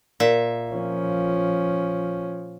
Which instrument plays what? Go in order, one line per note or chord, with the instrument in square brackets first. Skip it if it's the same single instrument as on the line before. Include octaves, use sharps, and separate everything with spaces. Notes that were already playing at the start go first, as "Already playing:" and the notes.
[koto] A#2 E5
[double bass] F3 C#4